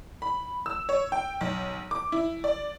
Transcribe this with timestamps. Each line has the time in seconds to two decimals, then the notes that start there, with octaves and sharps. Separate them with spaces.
0.22 B5
0.66 E6
0.89 C#5
1.12 G5
1.41 B1
1.91 D6
2.12 E4
2.44 D5